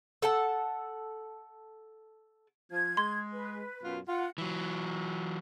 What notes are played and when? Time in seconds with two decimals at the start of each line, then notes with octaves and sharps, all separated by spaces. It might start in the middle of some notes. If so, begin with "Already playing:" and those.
0.22 A4 F#5 A5
2.72 F3 G#6
2.97 G#3 C6
3.32 B4
3.83 F#2 B2 F4
4.09 F4 F#5
4.38 E3 F#3